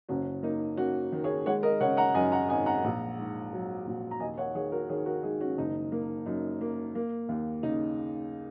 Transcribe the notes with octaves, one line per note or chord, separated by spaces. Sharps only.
F#1 C#4 F#4
A#3 D#4
A#3 C#4 F#4
D#3
G#4 C#5
G#3 C#5 F#5
A#4 D#5
C#3 C#5 F#5
F#5 A#5
F#2 D#5 G#5
F#5 A#5
G#1 D#5 G#5
F#5 A#5
A#1
G#2
F#3
A#1
A#5
D#2 D#5 G#5
C#5 F#5
D#3 G#4 C#5
F#4 A#4
D#3 G#4 C#5
F#4 A#4
G#3 D#4 G#4
C#4 F#4
F#1 D#4
A#3
F#2 D#4
A#3
A#3
D#2
C#3 D#4